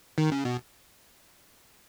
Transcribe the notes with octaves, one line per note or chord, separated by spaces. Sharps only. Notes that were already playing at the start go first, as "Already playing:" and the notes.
D#3
C#3
B2